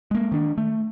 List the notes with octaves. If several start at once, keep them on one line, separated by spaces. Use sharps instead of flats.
G#3 A#3
D#3 D4
A3